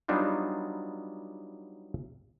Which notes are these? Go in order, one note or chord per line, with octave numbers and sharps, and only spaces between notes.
F#3 G3 B3 D4 D#4 F4